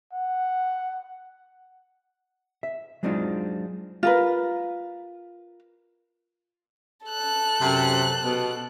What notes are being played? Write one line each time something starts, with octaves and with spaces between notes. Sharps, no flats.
F#5
E5
F#3 G#3 C4 D4 D#4 F4
F4 A#4 B4
A4 F#6
F#2 C3
B2